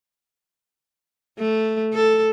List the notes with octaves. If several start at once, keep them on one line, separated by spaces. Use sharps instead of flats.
A3
A4